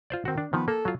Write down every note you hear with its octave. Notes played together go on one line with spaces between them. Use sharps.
F4 C5 D5
D#3 C4 F#4
D4
D#3 F3 B3
A#3 A4
F#3 F4